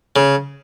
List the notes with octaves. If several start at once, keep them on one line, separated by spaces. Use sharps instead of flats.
C#3